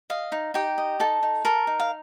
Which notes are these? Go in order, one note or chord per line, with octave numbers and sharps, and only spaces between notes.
D#5 F5
D#4
D#4 G4 G5
D#5
D#4 A4 A5
D#4
A4 A#4 A#5
D#4
F5